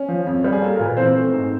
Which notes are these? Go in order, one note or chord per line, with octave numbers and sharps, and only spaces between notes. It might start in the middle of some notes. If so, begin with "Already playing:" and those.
Already playing: C#4
F3
F2
G3
G#4
A#3 A4
A#2 A#4
B4
E3 C4 C5
A3
G#2